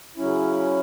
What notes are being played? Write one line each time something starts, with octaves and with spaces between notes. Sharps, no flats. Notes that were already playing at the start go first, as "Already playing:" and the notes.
C#3 F#3 C#4 E4